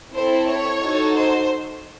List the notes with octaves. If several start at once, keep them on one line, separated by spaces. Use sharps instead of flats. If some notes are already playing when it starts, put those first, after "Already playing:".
C4 E4 A4 C5
C#5
D#4 F#4 A4
C5